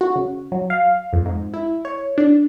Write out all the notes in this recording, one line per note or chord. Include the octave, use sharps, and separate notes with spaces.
F#4
C#3
F#3
F5
F2
G#2
E4
C#5
D4